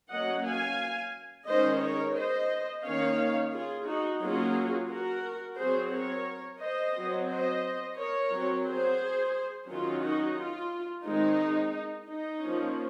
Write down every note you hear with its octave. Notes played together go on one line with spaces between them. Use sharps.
F#3 A#3 C#4 D#5 F#5
F5 G#5
D#3 G#3 C#4 C5 D#5
A#4 C#5
C5 D#5
D#3 A#3 C#4 C#5 F5
F4 G#4
D#4 F#4
F#3 A#3 C#4 F4 G#4
F#4 A#4
F#3 C4 G#4 C5
A#4 C#5
C5 D#5
F#3 C4
C5 D#5
A#4 C#5
F#3 C4
G#4 C5
D#3 F#3 C#4 F4
D#4 F#4
F4
D#3 G#3 C4 D#4
D#4
F3 A#3 C#4